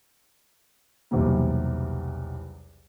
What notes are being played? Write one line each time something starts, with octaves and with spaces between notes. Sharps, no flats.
B1 E2 C3 E3 G3 A#3